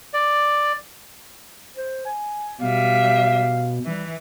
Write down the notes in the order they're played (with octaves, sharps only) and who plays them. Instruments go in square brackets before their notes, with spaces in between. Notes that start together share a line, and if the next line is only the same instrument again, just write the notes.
[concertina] D5
[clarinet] C5
G#5
[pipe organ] B2 [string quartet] G3 E5 [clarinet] F5
[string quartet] E3 [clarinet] G3